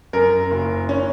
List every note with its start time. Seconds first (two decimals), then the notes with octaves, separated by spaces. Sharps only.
0.13 F#2 A#4
0.51 F#1
0.89 C#4